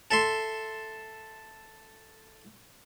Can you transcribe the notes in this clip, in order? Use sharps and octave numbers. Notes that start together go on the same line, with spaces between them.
A4 E5 C6